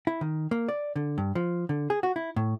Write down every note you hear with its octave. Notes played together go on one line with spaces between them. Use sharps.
E4
D#3
A#3
D5
D3
G2
F3
D3
G#4
F#4
E4
A2